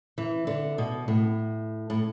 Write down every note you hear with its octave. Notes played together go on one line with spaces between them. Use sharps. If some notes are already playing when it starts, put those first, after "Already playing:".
E3
D3
B2
A2
A2